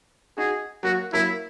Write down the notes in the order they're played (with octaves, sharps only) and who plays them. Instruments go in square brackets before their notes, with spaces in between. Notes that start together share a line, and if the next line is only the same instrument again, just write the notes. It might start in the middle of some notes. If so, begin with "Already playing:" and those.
[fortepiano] D#4 F#4 [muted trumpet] G#4
[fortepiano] F#3 A#3 [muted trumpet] F#4
[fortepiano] F#3 A#3 [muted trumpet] E4